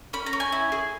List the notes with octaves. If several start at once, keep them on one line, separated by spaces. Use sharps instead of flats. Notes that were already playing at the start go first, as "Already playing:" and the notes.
C#4 B5
A#5
C#4
G#5
E4
G#4